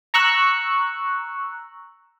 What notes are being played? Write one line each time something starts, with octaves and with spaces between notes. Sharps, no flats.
A#5 C#6 E6 F#6